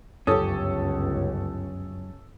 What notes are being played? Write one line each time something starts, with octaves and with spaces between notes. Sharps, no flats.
G1 C#2 F#2 C#4 G4 A4 C#5 D#6